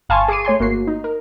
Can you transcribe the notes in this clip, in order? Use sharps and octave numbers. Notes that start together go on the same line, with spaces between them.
G1 F5 G#5 A5 C6 C#6
G#4 C#6 D6 C7 D#7
A3 C#5 G#5 C6
G1 A#3 F#4 C7
D#4
A#4